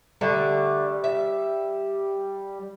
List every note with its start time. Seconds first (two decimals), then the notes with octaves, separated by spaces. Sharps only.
0.21 D3 G3 A3
1.04 E5